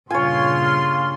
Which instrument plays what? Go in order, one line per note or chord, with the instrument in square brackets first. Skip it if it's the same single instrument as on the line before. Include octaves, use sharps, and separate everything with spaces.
[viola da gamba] G2 A#2 C#3 [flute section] F4 [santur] C#5 G#5 [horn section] C6